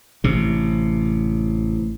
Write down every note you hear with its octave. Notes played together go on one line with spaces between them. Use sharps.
A1 C3